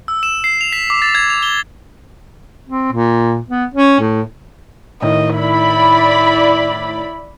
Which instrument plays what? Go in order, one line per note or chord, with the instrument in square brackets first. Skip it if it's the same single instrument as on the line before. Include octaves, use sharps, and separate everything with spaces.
[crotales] E6
E7
C7
F7
B6
D6
A6
G#6
F7
G7
[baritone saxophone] C4
A#2
B3
C#4
A2
[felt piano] A2 D#3 [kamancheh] D#5
[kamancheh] E4 [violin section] D5 B5